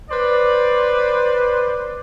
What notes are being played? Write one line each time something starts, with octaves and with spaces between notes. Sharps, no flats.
B4 C5 D5